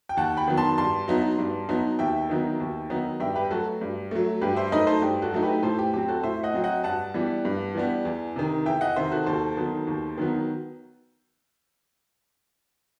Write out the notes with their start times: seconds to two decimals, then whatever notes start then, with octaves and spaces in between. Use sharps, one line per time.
0.09 G5
0.17 D#2 F#5 A5
0.37 G5 B5
0.48 D#3 F#3 B3
0.57 A5 C6
0.78 G2 A5 C6
1.08 F#3 B3 D#4
1.38 G2
1.69 F#3 B3 D#4
1.99 D#2 E5 G5
2.29 D#3 F#3 B3 D#4
2.60 D#2
2.90 D#3 F#3 B3 D#4
3.20 G2 E5 G5
3.36 G4 B4
3.51 F#3 A3 F#4 A4
3.81 G2
4.11 F#3 A3
4.42 G2 G4 B4
4.56 C5 E5
4.72 F#3 A3 D#4 B4 D#5
4.87 A4 C5
5.02 G2 G4
5.22 F#4 A4
5.33 F#3 A3 D#4
5.43 G4 B4
5.63 A2 A4 C5
5.79 G4
5.93 F#3 C4 G4
6.08 F#4 A4
6.23 A2 C5 E5
6.43 D#5 F#5
6.54 F#3 C4
6.64 D#5 F#5
6.84 G2 F#5 A5
7.14 E3 G3 B3
7.45 G2
7.75 E3 G3 B3
8.05 E2
8.36 C3 D#3
8.66 E2 E5 G5
8.81 D#5 F#5
8.96 C3 D#3 C5 E5
9.11 F#4 A4
9.26 D#2 A4 C5
9.57 D#3 F#3 B3
9.87 D#2
10.18 D#3 F#3 B3